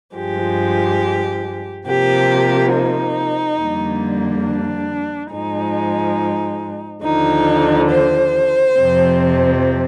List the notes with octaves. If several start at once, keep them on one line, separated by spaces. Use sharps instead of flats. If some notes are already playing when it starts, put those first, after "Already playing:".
G2 F3 G#3 G4
C3 F3 A#3 G4
D#4
F2 D3 G3 A#3
D4
G#2 F3 G#3 D#4
D#2 D3 F3 D#4
C5
F2 C3 F3 C4